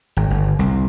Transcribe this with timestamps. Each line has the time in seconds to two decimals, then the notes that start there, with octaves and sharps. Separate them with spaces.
0.17 G#1
0.30 G1
0.59 C2